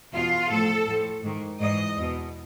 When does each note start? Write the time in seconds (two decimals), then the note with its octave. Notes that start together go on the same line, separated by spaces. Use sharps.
0.12 E2 B2 F4
0.49 A2 F3 A4
0.86 A2 F3
1.23 G#2 D#3
1.60 G#2 E3 D#5
1.97 E2 B2